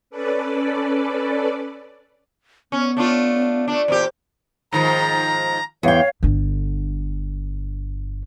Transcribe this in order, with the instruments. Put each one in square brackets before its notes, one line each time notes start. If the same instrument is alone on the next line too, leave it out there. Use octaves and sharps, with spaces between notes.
[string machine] C#4 A4 B4 D5
[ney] B3 [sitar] C#4
[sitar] A3 D4 F4
A3 D4
[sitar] E2 A#2 G4 [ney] C5
[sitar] G#2 D#3 F3 [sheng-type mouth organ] A#5
[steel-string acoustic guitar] E2 G5 [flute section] C#5 F5
[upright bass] G1 D3